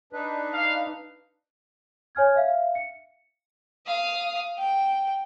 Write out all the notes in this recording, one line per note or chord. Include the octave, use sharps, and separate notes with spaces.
D4 D#4 B4
F5
C#5 G#5 F6 G#6
E5 F5
C#7
F5 D#6
G5